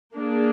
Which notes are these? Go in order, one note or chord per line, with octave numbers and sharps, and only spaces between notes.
A#3 D4 G#4